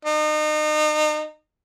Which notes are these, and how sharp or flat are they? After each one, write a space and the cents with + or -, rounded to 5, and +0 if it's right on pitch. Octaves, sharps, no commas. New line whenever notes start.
D#4 -35